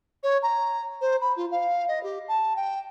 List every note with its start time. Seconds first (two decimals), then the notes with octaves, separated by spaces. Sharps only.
0.23 C#5
0.43 A#5
1.01 C5
1.21 B5
1.37 F4
1.51 F5
1.88 D#5
2.03 G4
2.28 A5
2.56 G5